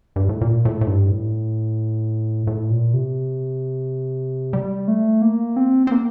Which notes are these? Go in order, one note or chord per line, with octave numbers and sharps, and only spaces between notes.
G2
A2
A#2
A2
A2
G2
A2
A2
A#2
C3
G3
A3
A#3
C4
C4
A#3